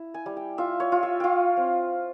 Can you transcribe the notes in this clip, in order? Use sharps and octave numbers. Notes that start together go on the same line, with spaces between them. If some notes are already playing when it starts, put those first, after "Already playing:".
Already playing: E4
G#5
G3
G5
F4 E5
C#5
F4
E5
F4 F5 G5
C4